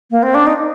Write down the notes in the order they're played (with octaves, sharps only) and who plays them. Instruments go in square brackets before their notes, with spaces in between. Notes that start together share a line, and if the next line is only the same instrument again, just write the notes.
[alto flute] A#3
C4
D4
D#4